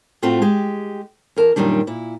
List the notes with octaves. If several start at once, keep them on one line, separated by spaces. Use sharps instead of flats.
A2 A3 C4 F4 F#4
G#3 G4
E2 A#4 A5
F#2 A#2 D#3 G3 D4
A#2 E4